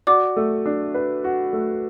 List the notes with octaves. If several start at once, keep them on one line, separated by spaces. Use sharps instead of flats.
F#4 D5 D6
A3
D4
B4
F#4
A3